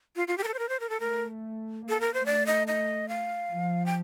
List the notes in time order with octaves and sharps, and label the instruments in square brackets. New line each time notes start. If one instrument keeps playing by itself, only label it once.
[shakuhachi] F4
F4
G4
A#4
A4
C5
A#4
C5
A#4
A4
[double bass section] A3 [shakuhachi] A#4
[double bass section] A#3 [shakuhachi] A4
[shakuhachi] A#4
C5
[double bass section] A3 [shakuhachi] D5
[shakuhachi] D#5
D#5
F5
[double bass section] F3
[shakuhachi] G5